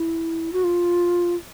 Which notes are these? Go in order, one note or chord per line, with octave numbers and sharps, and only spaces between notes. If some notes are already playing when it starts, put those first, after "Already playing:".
Already playing: E4
F#4
F4